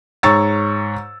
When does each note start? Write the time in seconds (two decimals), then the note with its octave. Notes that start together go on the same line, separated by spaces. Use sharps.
0.23 G#2 C#5 A#5 C#6 E6 A6